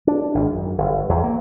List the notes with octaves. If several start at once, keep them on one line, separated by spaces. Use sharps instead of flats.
D4
G#1
F#2
G1
E2
A#3